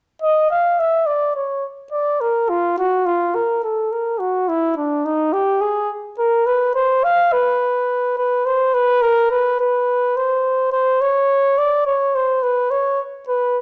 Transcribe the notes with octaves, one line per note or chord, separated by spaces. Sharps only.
D#5
F5
E5
D5
C#5
D5
A#4
F4
F#4
F4
A#4
A4
A#4
F#4
E4
D4
D#4
G4
G#4
A#4
B4
C5
F5
B4
B4
C5
B4
A#4
B4
B4
C5
C5
C#5
D5
C#5
C5
B4
C#5
B4